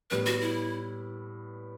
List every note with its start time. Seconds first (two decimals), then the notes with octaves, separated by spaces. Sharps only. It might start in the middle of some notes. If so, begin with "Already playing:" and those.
0.11 A2 G3 B3 B4
0.26 F#4
0.41 E4